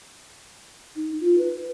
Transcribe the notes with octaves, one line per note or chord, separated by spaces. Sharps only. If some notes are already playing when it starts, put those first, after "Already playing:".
D#4
F4
B4